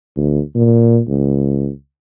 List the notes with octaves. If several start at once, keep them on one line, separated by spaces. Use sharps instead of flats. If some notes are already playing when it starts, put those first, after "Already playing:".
D2
A#2
C#2